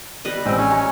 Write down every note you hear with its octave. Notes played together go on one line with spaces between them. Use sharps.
G3 B4 D#5
A1 G#3 C4 E6
C#4
G#5 A#5 C#6